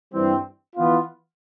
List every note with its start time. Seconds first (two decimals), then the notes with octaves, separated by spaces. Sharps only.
0.13 G2 E3 G3 C4
0.76 E3 B3 F4